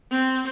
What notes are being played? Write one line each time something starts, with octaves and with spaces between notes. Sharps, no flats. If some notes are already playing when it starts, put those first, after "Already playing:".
C4